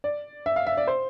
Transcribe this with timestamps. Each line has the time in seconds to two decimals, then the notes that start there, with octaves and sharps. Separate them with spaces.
0.04 D5
0.46 E5
0.56 F5
0.67 E5
0.77 D5
0.87 C5